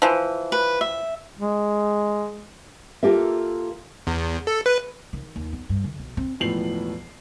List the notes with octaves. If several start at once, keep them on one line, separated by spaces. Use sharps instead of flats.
E3 F3
B4
E5
G#3
A#3 F4 G4 A4 A#4 E5
E2
A4
B4
D#3
D#2
B3
G2
D3
B1
C4
E1 A2 F3 B3 C7 F#7